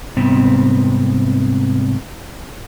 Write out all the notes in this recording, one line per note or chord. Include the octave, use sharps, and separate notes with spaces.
G#2 C3 G3 B3 C4